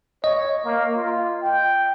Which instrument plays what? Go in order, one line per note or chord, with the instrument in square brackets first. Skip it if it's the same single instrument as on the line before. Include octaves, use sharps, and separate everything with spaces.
[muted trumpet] C#5 [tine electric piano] D#5
[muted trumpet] A#3
F4
G5